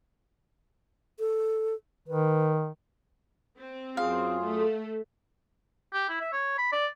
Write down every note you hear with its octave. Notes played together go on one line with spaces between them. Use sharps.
A4
D#3 B4
C4
F#2 F4 G#4 F5
A3
G4
E4
E5
C#5
B5
D5